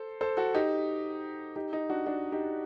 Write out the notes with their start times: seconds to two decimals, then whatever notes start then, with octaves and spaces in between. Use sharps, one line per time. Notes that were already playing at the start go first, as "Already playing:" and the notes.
Already playing: A4 C5
0.21 A4 C5
0.37 F#4 A4
0.54 D#4 G4
1.56 D#4 G4
1.73 D#4 G4
1.90 D4 F#4
2.06 D4 F#4
2.32 D#4 G4